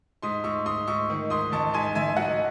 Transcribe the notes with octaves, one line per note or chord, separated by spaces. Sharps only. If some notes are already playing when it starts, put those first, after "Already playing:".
G#2 C6 D#6
G#2 C#6 E6
G#2 C6 D#6
G#2 C#6 E6
D#3
G#2 C6 D#6
A1 A5 C#6
G#2 G#5 C6
A1 E5 G#5
F#3 D#5 F#5